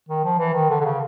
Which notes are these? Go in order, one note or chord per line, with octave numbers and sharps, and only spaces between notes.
D#3
F3
E3
D#3
D3
D3
C#3